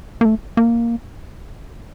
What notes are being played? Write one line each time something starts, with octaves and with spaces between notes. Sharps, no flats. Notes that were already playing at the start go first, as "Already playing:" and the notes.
A#3
A3
A#3